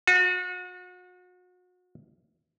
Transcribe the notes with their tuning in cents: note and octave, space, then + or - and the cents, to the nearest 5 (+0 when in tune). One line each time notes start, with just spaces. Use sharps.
F#4 -35